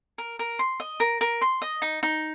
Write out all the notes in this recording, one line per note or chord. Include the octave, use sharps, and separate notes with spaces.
A#4
A#4
C6
D#5
A#4
A#4
C6
D#5
D#4
D#4